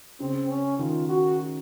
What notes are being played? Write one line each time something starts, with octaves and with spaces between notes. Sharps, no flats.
C#3 C4
C#4
D#3 F4
F#4